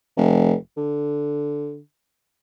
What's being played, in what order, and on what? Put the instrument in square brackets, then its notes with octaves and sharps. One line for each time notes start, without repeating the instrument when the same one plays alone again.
[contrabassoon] F1
D3